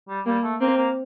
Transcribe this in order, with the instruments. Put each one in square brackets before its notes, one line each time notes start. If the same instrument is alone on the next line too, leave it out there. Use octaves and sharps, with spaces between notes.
[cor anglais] G3
[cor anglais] G3 [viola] A#3
[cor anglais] A3
[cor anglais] A#3 [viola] C4
[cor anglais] A#3